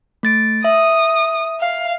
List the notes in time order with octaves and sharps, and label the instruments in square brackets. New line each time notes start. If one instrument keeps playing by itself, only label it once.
[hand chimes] A3 A6 D7
[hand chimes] E5 [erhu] D#6
[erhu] F5